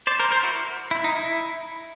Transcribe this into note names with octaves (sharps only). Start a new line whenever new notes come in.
C5 D5
A#4 C5
A#4 C5
E4 F#4
E4
D#4
E4